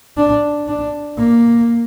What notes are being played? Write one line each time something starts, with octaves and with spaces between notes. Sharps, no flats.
D4
D4
A#3